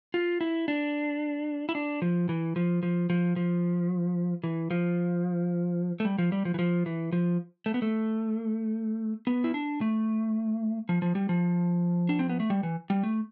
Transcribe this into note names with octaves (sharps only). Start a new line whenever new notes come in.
F4
E4
D4
E4
D4
F3
E3
F3
F3
F3
F3
E3
F3
A3
G3
F3
G3
F3
E3
F3
E3
F3
A3
B3
A3
B3
E4
D4
A3
F3
F3
G3
F3
D4
C4
B3
A3
G3
E3
G3
A3